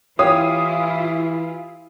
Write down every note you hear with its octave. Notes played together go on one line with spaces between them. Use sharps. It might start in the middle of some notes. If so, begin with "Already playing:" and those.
E3 E4 F4 G4 C#5 F5 D#6